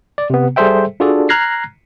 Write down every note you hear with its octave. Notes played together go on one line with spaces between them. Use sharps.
D5
C3 B3
G3 G#4 A4 C5 E5 G5
D4 F4 F#4 G#4 A4 D5
A#5 F6 F#6 G#6 A#6 C7